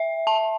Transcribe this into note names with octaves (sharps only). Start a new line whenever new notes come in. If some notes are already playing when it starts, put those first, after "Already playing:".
Already playing: E5
A5